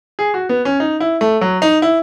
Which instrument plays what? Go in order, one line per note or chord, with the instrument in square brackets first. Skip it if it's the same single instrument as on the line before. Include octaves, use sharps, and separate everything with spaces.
[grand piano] G#4
F#4
B3
C#4
D#4
E4
A3
F#3
D#4
E4